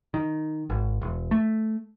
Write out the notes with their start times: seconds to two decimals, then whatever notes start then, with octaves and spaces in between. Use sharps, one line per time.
0.14 D#3
0.70 G#1
1.01 E1
1.31 A3